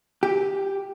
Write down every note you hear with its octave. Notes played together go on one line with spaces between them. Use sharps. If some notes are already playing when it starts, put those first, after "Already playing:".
G4